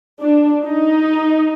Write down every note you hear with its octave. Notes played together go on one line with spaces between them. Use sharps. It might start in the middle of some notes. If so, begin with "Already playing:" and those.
D4
D#4